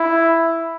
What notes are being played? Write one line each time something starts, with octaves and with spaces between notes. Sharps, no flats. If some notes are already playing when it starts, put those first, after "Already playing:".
Already playing: E4